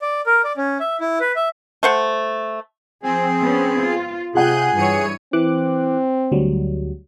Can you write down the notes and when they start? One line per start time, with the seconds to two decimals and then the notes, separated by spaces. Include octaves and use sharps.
0.02 D5
0.26 A#4
0.44 D5
0.57 C#4
0.80 E5
1.01 E4
1.20 B4
1.36 E5
1.83 A3 C5 F#5
3.03 F3 C4 G#4
3.41 B3 C#4
3.79 F4
4.35 C3 F4 G#4 F#5 G5 F#6 G6 D#7
4.76 G2 E3 C#5 C#7 D#7
5.33 E3 C4 D6 F#6
6.32 D2 F#3 G3